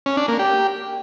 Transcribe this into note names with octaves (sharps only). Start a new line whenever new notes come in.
C#4
D4
A#3
G4